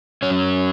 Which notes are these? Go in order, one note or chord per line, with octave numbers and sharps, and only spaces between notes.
F#3 C#4 C#5